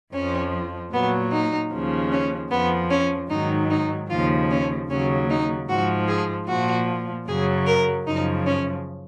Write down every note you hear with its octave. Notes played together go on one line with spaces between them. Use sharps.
F2 F3 C#4
A#2 F#3 B3
D#4
D#2 C#3 F3
C#4
F2 F3 B3
C#4
G#2 D#3 F#3 D#4
D#4
D#2 C#3 F3 F4
C#4
D#2 C#3 F#3 C#4
D#4
G#2 F3 F#4
G#4
A#2 F3 F#4
F#2 C#3 F#3 G#4
A#4
F#2 C#3 F3 D#4
C#4